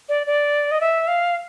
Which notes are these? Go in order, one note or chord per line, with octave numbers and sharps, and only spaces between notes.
D5
D5
D#5
E5
F5